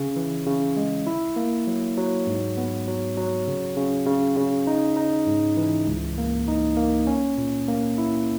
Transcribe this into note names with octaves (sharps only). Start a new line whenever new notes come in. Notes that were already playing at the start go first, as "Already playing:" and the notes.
Already playing: C#3
E3
C#3
G#3
E4
A#3
F#3
F#3
G#2
B3
F#3
F#3
C#3
C#3
C#3
C#3
D#4
D#4
G#2
E3
C#2
A#3
D#4
A#3
C#4
A#2
A#3
E4